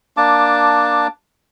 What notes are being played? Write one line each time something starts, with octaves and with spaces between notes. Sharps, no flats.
A#3 D4 A5 D6